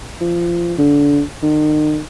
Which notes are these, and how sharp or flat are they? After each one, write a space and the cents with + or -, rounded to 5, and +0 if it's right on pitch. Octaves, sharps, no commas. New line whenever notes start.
F3 -20
D3 -25
D#3 -40